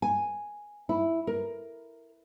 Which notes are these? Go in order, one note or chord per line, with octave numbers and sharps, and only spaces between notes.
G#5
E4
A#4